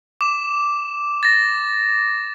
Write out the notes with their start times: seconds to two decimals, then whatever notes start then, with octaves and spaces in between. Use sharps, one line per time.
0.21 D6 E7
1.23 A6 A#6